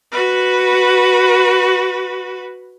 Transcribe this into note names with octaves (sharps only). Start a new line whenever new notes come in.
F#4 B4